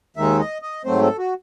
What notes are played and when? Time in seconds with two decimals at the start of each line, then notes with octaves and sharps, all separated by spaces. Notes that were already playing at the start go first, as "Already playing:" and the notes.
0.16 D#2 D#3 G#3 D#4 E5
0.39 D#5
0.62 D#5
0.85 G#2 F#3 A3 C4 C5
1.01 A4
1.19 F#4